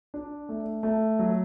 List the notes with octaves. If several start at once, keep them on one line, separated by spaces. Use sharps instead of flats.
D4
A3
A3
F#3